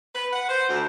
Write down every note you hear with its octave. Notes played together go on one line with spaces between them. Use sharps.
B4
F#5
C5
D2